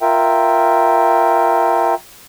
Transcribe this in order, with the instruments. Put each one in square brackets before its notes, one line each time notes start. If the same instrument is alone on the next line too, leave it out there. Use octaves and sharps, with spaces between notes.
[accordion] F4 A#4 E5 G5